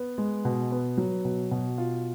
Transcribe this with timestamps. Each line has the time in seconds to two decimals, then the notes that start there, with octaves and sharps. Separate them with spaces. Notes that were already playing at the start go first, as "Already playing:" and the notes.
Already playing: B3
0.18 G#3
0.45 B2
0.72 B3
0.98 F#3
1.25 B2
1.51 B2
1.78 F4